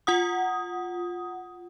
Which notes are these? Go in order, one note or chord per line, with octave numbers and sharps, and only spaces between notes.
F4 F#5 D#6